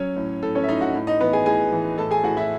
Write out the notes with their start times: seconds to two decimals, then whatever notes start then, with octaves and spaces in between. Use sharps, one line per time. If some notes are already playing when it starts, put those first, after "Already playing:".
Already playing: F#3 C#4 C#5
0.16 A2
0.42 A2 A4
0.55 C#4 C#5
0.64 E5
0.68 A2 D#4 D#5
0.81 F#4 F#5
0.95 A2
1.07 D#4 D#5
1.20 E3 B3 B4
1.33 G#4 G#5
1.46 A2 G#4 G#5
1.72 E3
1.98 A2 A4 A5
2.11 G#4 G#5
2.23 A2 F#4 F#5
2.37 E4 E5